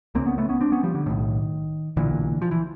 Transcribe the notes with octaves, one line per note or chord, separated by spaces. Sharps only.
C#2 C#3 A#3 C4
B3 C#4
A3 B3
B3 C#4
C4 D4
B3 C#4
F3 G3
D3
B1 A2 D#3
B1 A#2 D3 E3
F3
E3